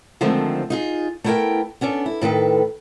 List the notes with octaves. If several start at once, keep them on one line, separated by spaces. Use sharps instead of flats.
D3 D#3 F3 G#3 A3 C4
D#4 F4 G#4
A3 B3 E4 F#4 A#4 G5
B3 C#4 D4 A4
E4
A2 D#3 A4 B4